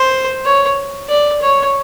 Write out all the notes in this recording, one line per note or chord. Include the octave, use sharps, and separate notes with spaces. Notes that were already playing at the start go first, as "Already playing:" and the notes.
Already playing: C5
C#5
D5
C#5